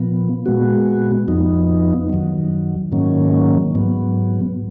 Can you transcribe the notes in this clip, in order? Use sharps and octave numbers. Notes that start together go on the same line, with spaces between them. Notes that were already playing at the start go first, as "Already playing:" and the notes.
Already playing: A#2 F3 B3
A#2 G#3 B3 F#4
F2 F3 B3 D#4
F#2 D#3 F#3
G#2 D#3 F#3 A#3 C#4
G#2 F#3 B3